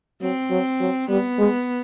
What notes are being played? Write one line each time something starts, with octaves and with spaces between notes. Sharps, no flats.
F#3 C4
F#3
F#3
G3 B3
G#3